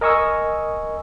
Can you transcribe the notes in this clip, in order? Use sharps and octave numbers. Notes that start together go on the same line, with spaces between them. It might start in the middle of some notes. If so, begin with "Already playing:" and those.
A#4 D#5 G#5 C#6 D#6 E6